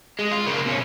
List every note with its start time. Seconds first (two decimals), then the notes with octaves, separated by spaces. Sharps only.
0.19 G#3
0.31 F4
0.46 C#3 A#3
0.66 B2 C#4